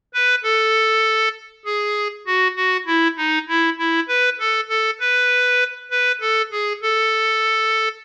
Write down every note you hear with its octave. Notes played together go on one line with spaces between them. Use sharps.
B4
A4
G#4
F#4
F#4
E4
D#4
E4
E4
B4
A4
A4
B4
B4
A4
G#4
A4